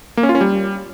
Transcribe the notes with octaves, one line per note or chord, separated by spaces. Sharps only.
A#3
C#4
F4
C#4
G3